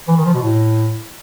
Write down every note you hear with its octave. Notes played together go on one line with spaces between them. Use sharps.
E3
D#3
F3
B2
A2